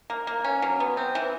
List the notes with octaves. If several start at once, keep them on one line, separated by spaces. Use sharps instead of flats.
A#3
A#3
C#4
F#3
B3
C4
E3